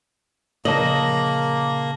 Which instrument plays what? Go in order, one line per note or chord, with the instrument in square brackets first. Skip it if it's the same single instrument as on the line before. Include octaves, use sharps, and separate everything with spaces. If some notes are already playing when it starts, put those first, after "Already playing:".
[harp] A#2 C#3 F3 [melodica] A#3 [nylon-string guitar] D#5 [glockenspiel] A5 A#6 F#7